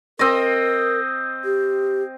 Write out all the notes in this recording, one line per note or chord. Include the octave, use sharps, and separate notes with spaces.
C4 A#4 D#5
G4